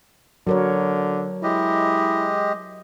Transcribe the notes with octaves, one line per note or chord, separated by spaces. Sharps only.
D3 F#3 A#4 C#5
G#3 E4 G4 D#5